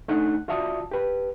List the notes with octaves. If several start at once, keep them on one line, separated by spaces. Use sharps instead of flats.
A3 D4 D#4 F#5 F#6
F4 F#4 D5 E5 A5 D#6
G4 B4